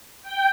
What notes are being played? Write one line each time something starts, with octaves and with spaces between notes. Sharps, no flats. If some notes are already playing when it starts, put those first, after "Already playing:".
G5